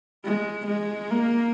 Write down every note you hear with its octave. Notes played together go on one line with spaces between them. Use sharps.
G#3
G#3
A#3